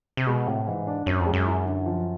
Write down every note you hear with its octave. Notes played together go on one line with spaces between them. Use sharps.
C3
B2 G#3
A2 C3
G#2 E3
D4
F#2 C#4
F2
G#3
F#2
E4
D3
F3